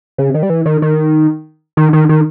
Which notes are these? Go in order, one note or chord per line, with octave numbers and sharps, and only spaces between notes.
C#3
D#3
G3
E3
D#3
D#3
D#3
D#3
D#3